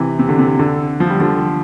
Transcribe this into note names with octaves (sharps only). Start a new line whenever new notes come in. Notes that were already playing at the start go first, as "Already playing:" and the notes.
Already playing: C3 E3
C3
D3
C3
D3
F3
G3
D3 F3